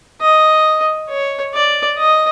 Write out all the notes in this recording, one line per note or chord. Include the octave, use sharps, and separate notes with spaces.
D#5
C#5
D5
D#5